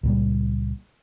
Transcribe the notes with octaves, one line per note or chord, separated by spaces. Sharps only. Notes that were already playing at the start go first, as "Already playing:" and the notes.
C#2 A#2 G3